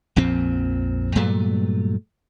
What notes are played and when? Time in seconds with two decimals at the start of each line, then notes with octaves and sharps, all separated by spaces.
0.16 A#1 F2 A#2 C4
1.15 G2 A#2 F#3 A3